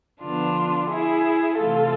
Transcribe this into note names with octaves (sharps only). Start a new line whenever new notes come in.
D3 F3 B3 D4 F4
E4 G#4
C3 E3 A3 F4 A4